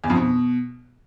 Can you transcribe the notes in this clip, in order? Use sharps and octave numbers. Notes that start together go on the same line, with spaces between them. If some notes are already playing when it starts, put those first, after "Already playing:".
E2
F2
B2